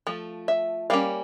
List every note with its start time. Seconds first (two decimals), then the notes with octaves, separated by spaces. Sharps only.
0.07 F3 A3
0.48 E5
0.90 G3 A#3 C#4 F5